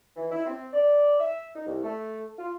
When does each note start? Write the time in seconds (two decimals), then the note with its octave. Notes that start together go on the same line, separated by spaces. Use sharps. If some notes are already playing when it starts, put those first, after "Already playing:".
0.17 E3
0.32 E4
0.46 C4
0.73 D5
1.19 E5
1.55 D#4
1.66 C2
1.84 A3
2.38 F4